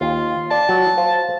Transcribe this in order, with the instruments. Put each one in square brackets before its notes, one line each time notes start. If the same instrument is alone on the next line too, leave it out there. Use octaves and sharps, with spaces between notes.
[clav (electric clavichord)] D#2 [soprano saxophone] F4
[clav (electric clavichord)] D5 [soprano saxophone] A5
[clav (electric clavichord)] F#3
C5 F5